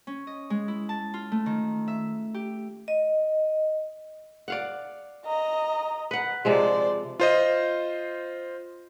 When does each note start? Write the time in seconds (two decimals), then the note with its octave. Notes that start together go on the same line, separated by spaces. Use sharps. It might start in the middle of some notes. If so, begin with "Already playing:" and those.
0.07 C#4
0.27 D#5
0.50 G#3
0.68 E4
0.89 A5
1.14 F4
1.32 A3
1.46 D#3
1.88 E5
2.34 G4
2.88 D#5
4.48 D5 F5 F#5
5.26 D#5 A#5
6.11 B4 F#5
6.45 C3 F3 G#3 C5 D5
7.20 F4 C5 D#5